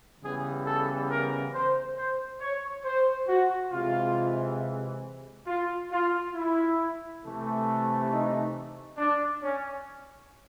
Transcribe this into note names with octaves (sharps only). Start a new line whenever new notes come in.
C#3 E3 G3 B3 G#4
A4
A#4
C5
C5
C#5
C5
F#4
C3 E3 G#3 F4
F4
F4
E4
C3 E3 A3
D#4
D4
C#4